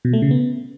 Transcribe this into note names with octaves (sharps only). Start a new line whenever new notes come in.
B2
A3
C#3
B3